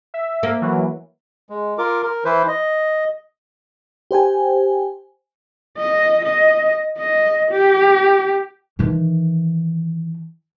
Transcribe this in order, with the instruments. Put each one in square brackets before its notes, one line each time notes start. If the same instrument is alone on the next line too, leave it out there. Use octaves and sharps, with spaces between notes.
[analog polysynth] E5
[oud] A#3
[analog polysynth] E3 F#3
[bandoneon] G#3
F4 A#4 D6
A#4
E3 E4 B4 C5
D#5
[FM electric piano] G4 C5 G5 G#5
[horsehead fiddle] D#5
D#5
D#5
G4
[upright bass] D#3 E3